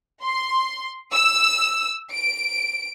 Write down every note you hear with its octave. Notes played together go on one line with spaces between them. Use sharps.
C6
E6
D7